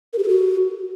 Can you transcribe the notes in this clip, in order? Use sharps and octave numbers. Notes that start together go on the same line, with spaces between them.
A#4
G4
A4
F#4